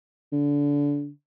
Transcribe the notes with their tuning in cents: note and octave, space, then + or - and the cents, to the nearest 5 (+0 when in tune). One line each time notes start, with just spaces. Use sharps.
D3 -25